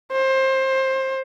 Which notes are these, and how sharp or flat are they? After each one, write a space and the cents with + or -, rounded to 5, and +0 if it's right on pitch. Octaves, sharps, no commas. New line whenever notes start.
C5 +20